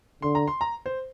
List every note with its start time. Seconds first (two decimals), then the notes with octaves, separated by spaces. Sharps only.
0.22 D3 C6
0.35 A#5
0.48 C6
0.61 A#5
0.86 C5